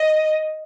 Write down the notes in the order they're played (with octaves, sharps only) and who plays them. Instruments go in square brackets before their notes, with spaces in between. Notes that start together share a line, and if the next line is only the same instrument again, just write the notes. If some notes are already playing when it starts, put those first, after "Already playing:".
Already playing: [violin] D#5